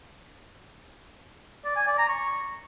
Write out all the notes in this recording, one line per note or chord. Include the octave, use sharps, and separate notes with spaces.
D5
G#5
D5
A#5
C#6